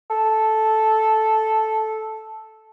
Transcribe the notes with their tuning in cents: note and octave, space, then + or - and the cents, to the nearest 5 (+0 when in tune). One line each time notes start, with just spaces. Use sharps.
A4 -5